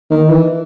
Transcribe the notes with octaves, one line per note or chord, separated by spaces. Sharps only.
D#3
E3